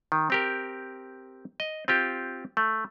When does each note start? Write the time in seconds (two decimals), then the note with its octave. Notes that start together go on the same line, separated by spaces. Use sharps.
0.12 D#3
0.30 C4 G4 A#4
1.60 D#5
1.88 C4 F4 G4
2.57 A3